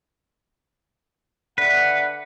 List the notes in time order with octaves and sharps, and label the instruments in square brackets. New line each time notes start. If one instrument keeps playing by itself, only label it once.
[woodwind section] D3 E5 F#5 [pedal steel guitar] B4